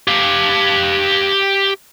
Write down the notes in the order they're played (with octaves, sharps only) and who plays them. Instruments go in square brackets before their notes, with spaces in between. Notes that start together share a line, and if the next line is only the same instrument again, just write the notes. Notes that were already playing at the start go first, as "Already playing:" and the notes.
[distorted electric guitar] G4 F5